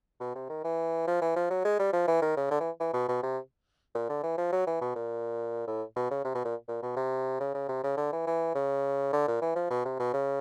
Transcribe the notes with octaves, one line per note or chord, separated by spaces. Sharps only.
B2
C3
D#3
E3
F3
E3
F3
F#3
G#3
G3
F3
E3
D#3
C#3
D3
E3
E3
B2
B2
C3
A#2
D3
E3
F3
F#3
E3
B2
A#2
A2
B2
C#3
C3
B2
A#2
A#2
B2
C3
C#3
C#3
C3
C#3
D3
E3
E3
C#3
D3
A#2
E3
F3
B2
C3
B2
C#3